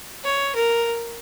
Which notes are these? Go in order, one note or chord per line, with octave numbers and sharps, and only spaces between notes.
C#5
A#4